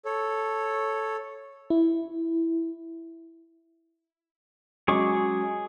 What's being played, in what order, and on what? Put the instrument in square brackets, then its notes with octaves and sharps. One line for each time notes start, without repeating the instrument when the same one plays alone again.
[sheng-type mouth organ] A4 C#5
[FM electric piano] E4
[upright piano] F#3 G#3 C#4 [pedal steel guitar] G#4 C#6 D6